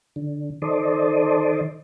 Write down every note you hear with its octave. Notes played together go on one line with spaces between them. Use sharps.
D3
D#3 A4 C5 D5 D#5